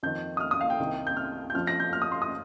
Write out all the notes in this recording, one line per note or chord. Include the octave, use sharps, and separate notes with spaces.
F2 D#3 G6
D#6
F6
D#6
F5
G5
C2 C3 D#3
G6
F6
G6
F2 F3 F6
A#6
G6
F6
D#6
C6
D#6